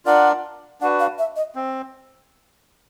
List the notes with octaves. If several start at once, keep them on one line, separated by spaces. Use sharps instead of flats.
D4 F4 A#4 D5 F#5
D4 F#4 B4 F#5
F5
E5
D#5
C4